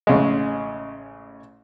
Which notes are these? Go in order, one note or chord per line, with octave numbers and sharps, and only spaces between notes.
A1 C#3 G#3